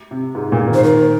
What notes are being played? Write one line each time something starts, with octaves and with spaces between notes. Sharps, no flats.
C3
G#2
A#2
D#3
C5
D#3 A#4